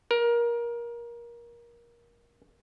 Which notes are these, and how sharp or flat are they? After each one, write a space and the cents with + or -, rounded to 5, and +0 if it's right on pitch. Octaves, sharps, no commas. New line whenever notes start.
A#4 +20